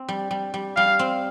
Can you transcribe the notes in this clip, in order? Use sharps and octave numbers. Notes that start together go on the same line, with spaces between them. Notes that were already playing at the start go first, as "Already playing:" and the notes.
Already playing: C4
G3
G3
G3
G3 F5
C4